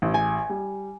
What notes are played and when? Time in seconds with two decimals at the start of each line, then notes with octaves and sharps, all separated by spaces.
0.02 A1
0.14 G#5
0.49 G3